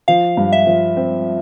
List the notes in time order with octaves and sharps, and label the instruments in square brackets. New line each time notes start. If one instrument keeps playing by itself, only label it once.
[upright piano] F3 [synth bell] F5
[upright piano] G2
[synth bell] E5
[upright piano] F3
C4